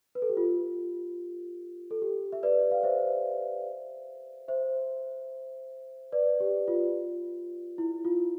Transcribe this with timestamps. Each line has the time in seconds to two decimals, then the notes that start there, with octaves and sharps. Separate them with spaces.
0.15 B4
0.22 A4
0.30 G4
0.37 F4
1.91 A4
2.02 G4
2.33 E5
2.43 B4 D5
2.71 F5
2.83 C5 E5
4.48 C5 E5
6.12 B4 D5
6.40 G4
6.68 F4
7.78 E4
8.05 F4